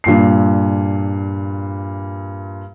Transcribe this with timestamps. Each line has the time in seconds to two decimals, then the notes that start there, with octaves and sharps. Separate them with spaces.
0.04 G2 A#2 C7